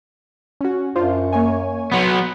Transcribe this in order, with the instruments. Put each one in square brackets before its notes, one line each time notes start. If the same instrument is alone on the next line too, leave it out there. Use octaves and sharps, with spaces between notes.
[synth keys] C#4 F#4
[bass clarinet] F#2 [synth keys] D4 F4 C5
[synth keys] A#3 C#5 G#5
[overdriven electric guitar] F#3 B3 [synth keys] C#5 C6 G#6